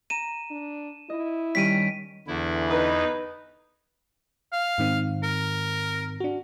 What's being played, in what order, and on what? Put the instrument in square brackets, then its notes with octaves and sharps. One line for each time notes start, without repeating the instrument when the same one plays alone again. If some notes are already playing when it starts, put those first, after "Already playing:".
[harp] A#5 [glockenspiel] D#7 E7
[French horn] D4
[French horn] E4 [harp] D#5
[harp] D#3 G3 C#4 [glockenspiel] B6 D7 D#7
[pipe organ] E2 E4 [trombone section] D3 E3
[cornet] D#4 [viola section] B4
[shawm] F5
[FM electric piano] G#2 D#3 C4
[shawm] A#4
[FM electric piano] D4 F#4